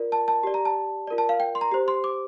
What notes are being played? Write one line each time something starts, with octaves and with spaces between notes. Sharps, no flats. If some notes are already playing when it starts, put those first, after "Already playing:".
Already playing: F4 A#4 D5
A5
A5
G4 D5
A#5
A5
F4 A#4 D5
A5
F5
G5
C6
A#5
G4 C5
C6
D6